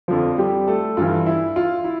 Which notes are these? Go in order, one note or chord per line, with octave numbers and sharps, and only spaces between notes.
F2 D3 F3 F4
G3 G4
A3 A4
G2 E3 F4
E4
F4
E4